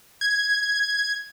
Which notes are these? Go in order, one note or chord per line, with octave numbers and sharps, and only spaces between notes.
G#6